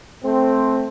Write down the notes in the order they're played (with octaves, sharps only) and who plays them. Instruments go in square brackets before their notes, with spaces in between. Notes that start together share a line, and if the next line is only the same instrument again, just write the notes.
[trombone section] A3 C4